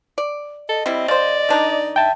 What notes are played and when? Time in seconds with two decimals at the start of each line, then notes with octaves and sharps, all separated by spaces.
0.18 D5
0.69 A4 D#5
0.86 G3 C4 E4
1.08 C#3 C5 D5
1.49 D#3 D4 D#4
1.96 E5 G5 A5